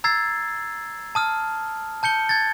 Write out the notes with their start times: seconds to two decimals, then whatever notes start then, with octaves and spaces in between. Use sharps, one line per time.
0.04 A#5 E6 G#6 A6 C7
1.15 A5 D#6 F6
2.03 A5 G6 C#7 G7
2.29 G#6 A6